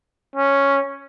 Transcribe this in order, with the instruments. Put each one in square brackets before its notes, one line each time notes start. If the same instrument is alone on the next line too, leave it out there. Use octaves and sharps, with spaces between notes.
[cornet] C#4